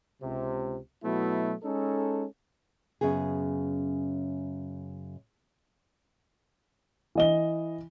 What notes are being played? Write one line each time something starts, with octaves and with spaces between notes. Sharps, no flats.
C#2 C3
B2 F#3 A3 B3 E4
G#3 C#4 D#4 A4
F#2 C#3 B3 G#4
E3 D#5 G7